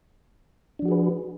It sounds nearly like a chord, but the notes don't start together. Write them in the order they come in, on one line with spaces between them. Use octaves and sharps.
D4 F3 F#4 G#4 B4